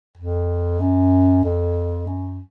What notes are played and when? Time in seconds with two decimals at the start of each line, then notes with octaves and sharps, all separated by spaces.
0.18 F2
0.80 F#2
1.44 F2
2.07 F#2